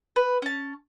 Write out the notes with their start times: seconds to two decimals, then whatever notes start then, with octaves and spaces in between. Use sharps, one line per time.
0.16 B4
0.42 C#4 A5